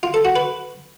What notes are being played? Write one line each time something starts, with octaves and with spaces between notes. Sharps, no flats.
F4
A4
F#4
B4